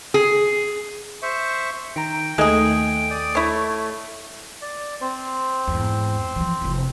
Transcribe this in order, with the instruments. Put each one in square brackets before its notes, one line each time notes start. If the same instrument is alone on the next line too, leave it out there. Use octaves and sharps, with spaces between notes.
[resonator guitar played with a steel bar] G#4
[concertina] C5 E5 C#6
[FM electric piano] D#3 A#5 [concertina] G5
[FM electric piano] D#2 D#3 A3 [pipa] G#3 G#4
[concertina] D5 D#6
[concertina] A3 [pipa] E4 C#5
[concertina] D5
C4 C5
[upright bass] E2 G#2
E3 F3
F1 E4